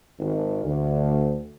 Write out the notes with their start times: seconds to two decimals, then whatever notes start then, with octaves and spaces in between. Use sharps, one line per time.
0.20 G#1
0.64 D2